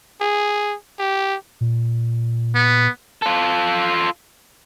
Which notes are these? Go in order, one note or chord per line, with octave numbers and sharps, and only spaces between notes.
G#4
G4
A#2
B3
F4 A4